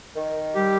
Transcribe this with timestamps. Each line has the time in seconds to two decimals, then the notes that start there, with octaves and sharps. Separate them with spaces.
0.15 D#3
0.55 G3 G4